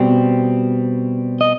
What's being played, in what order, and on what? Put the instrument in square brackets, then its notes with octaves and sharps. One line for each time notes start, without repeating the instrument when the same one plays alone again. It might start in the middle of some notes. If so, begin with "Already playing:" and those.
Already playing: [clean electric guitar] B2 G3 C4
D#5